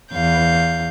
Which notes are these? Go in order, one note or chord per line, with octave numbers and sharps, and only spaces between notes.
E2 F5 G6